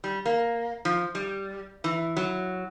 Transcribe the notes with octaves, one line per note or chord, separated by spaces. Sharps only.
G3
A#3
F3
G3
E3
F#3